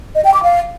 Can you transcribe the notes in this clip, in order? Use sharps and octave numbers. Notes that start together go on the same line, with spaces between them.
D#5
G5
D6
F5